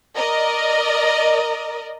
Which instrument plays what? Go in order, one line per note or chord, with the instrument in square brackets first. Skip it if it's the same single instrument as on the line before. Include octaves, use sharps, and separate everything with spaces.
[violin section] A#4 D5 D#5